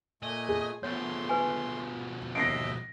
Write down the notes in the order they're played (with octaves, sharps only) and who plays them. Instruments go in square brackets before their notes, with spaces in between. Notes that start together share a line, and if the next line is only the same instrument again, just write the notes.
[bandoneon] A#2 A3 G#5 [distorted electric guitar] D#5
[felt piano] G#4
[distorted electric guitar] B2 F3 [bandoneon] A3 C6 [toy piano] C#5
[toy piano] B4 G#5
[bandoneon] D#2 D#5 E5 [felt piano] A#6 C7 D7